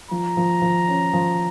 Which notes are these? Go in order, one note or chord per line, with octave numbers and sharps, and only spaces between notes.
F3 A#5
F3
F3
C#4
F3